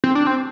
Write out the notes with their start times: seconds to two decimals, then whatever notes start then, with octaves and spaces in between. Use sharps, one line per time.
0.04 C4
0.15 D4
0.27 C4